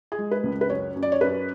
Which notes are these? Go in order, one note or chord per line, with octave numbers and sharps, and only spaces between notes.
G#4
G#3
B4
C#2
B4
F#2 C#5
F#2
D5
C#5
F#2 B4